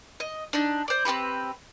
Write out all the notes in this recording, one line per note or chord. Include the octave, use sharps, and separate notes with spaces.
D#5
D4 D#4
C5 D5
C4 D4 G4 B4